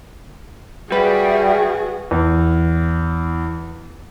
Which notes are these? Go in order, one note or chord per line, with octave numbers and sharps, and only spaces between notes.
G3 F#4 G#4 B4 E5
E2 E3